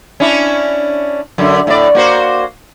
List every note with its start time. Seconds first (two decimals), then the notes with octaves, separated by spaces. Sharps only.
0.20 C#4 D4 E4
1.38 F#2 D3
1.67 A2 D5
1.95 A#3 F#4 C5